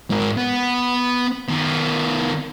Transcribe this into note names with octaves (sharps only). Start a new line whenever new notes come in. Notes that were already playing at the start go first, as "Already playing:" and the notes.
G#2 A#4
B3
D#3 B3